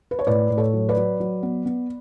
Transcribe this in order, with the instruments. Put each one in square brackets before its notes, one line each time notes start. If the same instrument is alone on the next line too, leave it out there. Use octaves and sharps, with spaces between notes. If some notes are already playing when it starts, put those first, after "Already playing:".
[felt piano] B4
C#5
A2 B4 D5
A2
A4 C#5
F#3
B4 D5
F#3
F#3
B3
B3